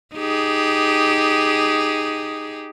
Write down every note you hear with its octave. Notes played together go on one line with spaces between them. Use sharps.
D#4 G4 G#4